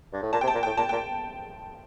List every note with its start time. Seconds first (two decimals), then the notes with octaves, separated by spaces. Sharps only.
0.13 G2
0.22 A2
0.33 A#2 A5
0.41 C3 G5
0.48 A5
0.55 A#2
0.63 G5
0.66 A2
0.77 A#2 A5
0.89 G5
0.92 A#2